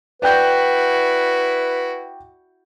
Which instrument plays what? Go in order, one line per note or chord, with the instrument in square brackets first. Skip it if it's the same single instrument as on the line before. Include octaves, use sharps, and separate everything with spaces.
[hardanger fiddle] E4 F#4 [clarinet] B4 [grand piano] D5 G5 G6